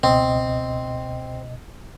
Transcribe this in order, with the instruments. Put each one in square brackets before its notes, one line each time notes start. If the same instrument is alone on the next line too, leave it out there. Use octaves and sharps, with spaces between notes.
[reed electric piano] C#2 B2 D#5 [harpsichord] C4